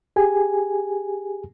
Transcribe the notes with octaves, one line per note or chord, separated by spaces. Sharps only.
G4 G#4 G#5